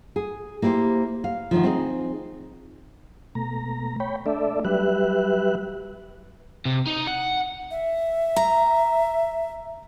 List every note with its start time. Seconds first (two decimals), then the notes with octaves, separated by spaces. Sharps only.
0.16 G#4
0.62 A#3 E4 G4 G#4 C5
1.24 F5
1.51 D2 A2 D#3 F3
1.63 C4 D#4 G#4
3.35 B2 A3 A#5
4.00 C#5 G5 B5
4.26 A3 D4 A4 D5 E5
4.65 F#3 G3 G4 B4 E5 F#6
6.65 C3
6.86 D#4
7.07 F#5
7.71 E5
8.36 A#5